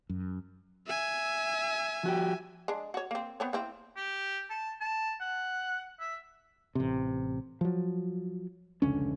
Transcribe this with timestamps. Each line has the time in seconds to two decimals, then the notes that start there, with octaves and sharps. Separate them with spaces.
0.10 F#2
0.87 E5 G#5
2.03 F3 F#4 G4
2.68 G#3 D4
2.94 F#4 C#5
3.11 A#3 C4
3.40 B3 C4 C#5
3.53 A#3 C4 E4
3.96 G4
4.50 A5
4.81 A5
5.20 F#5
6.00 E5
6.75 A1 C3
7.61 F3 F#3
8.82 F1 C#2 D3 C#4